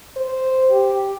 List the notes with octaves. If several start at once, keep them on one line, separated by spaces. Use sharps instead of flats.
C5
G4